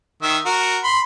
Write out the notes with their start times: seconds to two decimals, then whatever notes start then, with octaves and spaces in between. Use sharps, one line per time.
0.23 D#3 E5
0.46 F#4 A#4
0.84 B5 C6